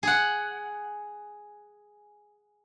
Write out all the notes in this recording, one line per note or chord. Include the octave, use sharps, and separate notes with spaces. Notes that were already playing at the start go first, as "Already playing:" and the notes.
G#4 F#5